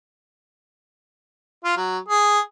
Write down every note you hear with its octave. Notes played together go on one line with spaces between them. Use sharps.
F4
F#3
G#4